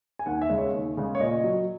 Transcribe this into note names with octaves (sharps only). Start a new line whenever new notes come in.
G#5
D#2 F#5
E5
C#3 G#3
C#5
D#2
C#3 G#3
C#5
A#2 D#5
F#3